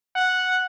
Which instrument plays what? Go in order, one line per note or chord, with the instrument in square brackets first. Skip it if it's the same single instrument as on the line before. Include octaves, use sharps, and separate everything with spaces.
[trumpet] F#5